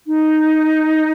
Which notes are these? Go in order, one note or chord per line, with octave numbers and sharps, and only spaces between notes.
D#4